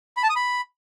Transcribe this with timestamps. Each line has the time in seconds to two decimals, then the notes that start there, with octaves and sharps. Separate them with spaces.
0.17 B5
0.23 A5
0.30 D#6
0.36 B5